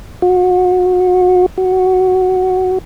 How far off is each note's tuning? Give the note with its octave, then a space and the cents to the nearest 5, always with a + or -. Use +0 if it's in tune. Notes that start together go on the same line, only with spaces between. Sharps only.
F#4 -30
F#4 +5